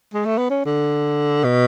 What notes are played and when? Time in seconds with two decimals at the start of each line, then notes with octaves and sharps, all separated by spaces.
0.14 G#3
0.25 A3
0.38 B3
0.50 C#4
0.65 D3
1.44 B2